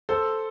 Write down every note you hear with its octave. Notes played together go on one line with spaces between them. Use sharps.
A4 C5